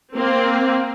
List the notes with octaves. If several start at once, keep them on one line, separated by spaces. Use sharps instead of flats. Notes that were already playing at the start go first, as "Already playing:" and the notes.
A#3 C4